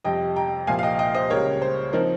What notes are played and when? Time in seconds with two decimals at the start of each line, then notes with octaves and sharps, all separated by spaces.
0.04 F2 C3 G3 D#5 G5
0.36 G5 A#5
0.67 C2 A#2 F3 F5 G#5
0.79 F5
0.83 D#5 G5
0.99 D#5 G5
1.15 C5 D#5
1.30 C#2 C#3 G3 A#4 C#5
1.62 C5
1.93 F3 C4 D#4 A#4